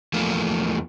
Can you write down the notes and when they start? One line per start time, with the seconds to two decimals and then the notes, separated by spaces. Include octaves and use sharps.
0.13 E2 F3 A3 A#3